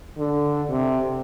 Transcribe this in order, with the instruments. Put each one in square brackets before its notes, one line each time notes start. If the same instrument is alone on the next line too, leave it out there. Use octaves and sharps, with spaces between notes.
[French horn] D3
C3